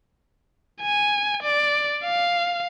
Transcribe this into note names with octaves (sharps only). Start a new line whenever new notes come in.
G#5
D5
F5